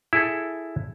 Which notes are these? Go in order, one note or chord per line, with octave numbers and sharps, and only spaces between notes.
E4 G#4 A4